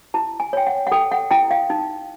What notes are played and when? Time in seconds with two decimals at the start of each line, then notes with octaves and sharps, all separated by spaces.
0.14 E4 A5
0.40 G#5
0.53 C#5 G5
0.67 F#5
0.87 F#5
0.92 A4 G5
1.12 F#5
1.31 E4 G5
1.51 F5
1.70 D#4